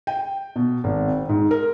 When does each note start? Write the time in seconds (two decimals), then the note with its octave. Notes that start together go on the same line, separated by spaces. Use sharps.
0.07 G5
0.56 B2
0.84 G#1
1.08 C4
1.29 G#2
1.51 A#4